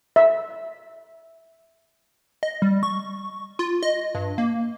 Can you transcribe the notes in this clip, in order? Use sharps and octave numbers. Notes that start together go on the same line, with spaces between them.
E5
D#5
G3
C#6
F4
D#5
G2
A#3